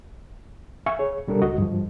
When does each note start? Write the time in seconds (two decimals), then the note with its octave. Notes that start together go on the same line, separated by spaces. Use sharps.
0.86 E5 F5 G#5 C#6
0.99 G#4 C#5
1.28 B2 G3 D4 A4 A#4
1.42 C#2 F#4 D#5
1.58 G2 F3